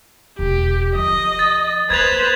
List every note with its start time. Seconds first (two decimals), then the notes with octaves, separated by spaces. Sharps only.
0.39 E1 G4
0.95 F3 D#5
1.39 A6
1.90 A#3 B4 C5 G#6 A6 F7